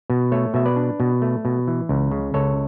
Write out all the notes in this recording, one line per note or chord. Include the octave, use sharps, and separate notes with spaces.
B2
A3 A4 C#5
B2 E5
B4 D5
D4
B2
A3
B2
E3
C#2
C#3
C#2 A4 C#5